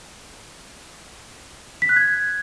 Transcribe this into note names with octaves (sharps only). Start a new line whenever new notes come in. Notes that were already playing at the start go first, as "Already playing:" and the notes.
B6
F#6
G#6